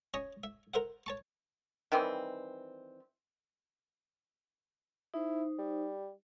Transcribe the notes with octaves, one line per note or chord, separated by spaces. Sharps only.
C#4 C#5 D#5
E5
A#4 C5 E5 F#5
C#5 A5 C#6
D#3 E3 G3 C4
D#4 E4 C5
G3